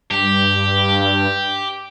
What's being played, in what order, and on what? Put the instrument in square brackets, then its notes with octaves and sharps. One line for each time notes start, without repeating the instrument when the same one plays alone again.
[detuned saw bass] G2 [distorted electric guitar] G4